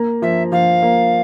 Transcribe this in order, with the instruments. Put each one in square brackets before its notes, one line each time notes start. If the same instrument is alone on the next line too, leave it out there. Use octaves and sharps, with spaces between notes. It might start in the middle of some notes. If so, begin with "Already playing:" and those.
Already playing: [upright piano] A#3
[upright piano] F3 [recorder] E5
[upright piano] F3 [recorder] F5
[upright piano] A#3